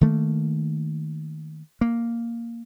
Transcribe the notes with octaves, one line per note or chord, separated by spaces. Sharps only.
D#3 A3 A#3
A#3